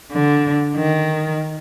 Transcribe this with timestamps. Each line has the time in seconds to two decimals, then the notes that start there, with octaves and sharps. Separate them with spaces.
0.12 D3
0.76 D#3